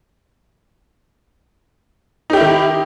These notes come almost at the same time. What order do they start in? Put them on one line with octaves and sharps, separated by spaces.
D#4 G4 E4 D#3